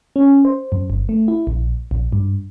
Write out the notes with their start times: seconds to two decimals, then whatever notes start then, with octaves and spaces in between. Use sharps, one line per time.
0.16 C#4
0.45 C5
0.72 F#2
0.90 G1
1.09 A3
1.28 E4
1.47 A#1
1.91 A#1
2.12 G2